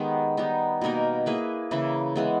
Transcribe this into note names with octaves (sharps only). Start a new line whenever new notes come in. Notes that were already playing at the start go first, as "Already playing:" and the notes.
Already playing: D#3 G#3 B3 G4
G3 B3 D#4
B2 A#3 D#4 A#4
A#3 E4 G#4 B4
C#3 E3 A#3 E4
E3 G#3 B3